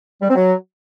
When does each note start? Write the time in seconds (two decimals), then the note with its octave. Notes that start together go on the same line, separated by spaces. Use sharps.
0.22 G3
0.29 C4
0.36 F#3